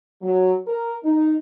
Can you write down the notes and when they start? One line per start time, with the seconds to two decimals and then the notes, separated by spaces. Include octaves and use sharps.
0.22 F#3
0.67 A#4
1.04 D#4